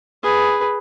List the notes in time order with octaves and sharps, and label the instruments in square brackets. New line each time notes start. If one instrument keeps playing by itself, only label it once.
[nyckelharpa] G#4 B4